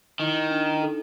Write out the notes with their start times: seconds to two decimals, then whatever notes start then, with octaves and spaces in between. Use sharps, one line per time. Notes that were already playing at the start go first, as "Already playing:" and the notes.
0.20 D#3 E4
0.36 D#4
0.50 D4
0.66 D#4
0.82 A4